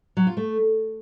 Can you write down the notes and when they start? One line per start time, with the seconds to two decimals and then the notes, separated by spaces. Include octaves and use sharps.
0.17 F#3
0.27 F4
0.37 A3